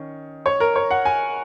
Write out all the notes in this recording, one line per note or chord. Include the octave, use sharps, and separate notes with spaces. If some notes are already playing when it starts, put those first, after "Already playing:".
Already playing: D#3 C#4
C#5
A#4
C#5
F#5
G#5